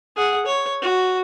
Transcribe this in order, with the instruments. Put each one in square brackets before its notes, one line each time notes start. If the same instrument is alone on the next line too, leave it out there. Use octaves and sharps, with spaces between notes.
[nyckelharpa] G#4 F#5
C#5
F#4